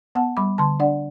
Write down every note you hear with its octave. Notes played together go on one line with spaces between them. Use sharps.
B3 F#5 A5
G3 B5 D6
D3 A5 C6
D4 D5 F#5